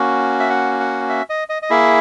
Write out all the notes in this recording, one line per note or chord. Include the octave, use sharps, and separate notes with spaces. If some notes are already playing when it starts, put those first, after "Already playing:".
Already playing: A#3 C#4 F#4
E5
F#5
F#5
E5
D#5
D#5
D#5
A#3 E4 G#4 E5